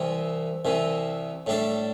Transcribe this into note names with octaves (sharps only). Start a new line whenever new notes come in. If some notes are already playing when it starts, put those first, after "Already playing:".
Already playing: C2 C3 E3
C2 C3 E3
A2 G3 D4 A4